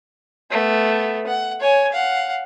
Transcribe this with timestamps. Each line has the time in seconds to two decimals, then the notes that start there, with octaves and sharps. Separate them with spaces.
0.51 A3 B3
1.27 F#5
1.60 C#5 G#5
1.93 F5 F#5